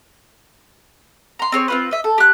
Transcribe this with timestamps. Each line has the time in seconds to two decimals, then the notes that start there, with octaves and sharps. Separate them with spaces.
1.39 A#5 C6
1.52 C4 G#4 C#5
1.68 C4 F4 B4
1.91 D#5 E5
2.04 A4
2.18 G4 F#6